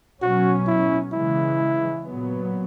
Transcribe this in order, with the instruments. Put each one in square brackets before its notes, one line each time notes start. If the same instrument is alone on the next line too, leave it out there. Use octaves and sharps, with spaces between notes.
[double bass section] B2 F#3 C#4 [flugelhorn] F#4
[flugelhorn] E4
[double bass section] C#3 E3 G#3 [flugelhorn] E4
[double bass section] A#2 F#3 B3